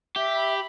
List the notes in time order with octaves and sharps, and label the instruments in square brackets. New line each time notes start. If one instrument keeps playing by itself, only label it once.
[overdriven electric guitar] G4 [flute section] E5
[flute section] B5